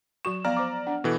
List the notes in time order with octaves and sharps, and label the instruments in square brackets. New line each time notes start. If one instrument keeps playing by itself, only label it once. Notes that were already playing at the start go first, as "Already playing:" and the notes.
[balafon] F#3 F#4 C#6 [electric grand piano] E7
[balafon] F3 B3 F5 [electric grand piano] D5 A#5 F6
[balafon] C5 D6
D4 F#5
[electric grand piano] B2 E3 [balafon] A4